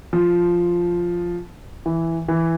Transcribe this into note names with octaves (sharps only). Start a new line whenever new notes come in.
F3
E3
E3